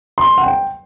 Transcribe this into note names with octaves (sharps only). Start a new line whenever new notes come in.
C6
F#5
G5